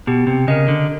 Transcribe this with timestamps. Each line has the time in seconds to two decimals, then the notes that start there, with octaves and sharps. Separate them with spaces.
0.07 B2 G4
0.27 C3
0.48 C#3 A#4 D#5
0.68 D3